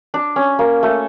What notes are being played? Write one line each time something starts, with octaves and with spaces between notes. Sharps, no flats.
D4
C#4
A#3
A3